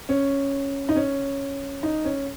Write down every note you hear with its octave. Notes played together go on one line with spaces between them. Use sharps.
C#4
D#4
C#4
D#4
C#4